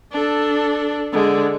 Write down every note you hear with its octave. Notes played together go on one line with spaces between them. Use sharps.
D4 A4
D3 G#3